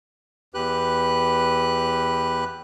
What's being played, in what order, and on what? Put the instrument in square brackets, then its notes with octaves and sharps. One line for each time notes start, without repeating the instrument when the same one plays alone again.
[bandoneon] E2 G4 B4 F#6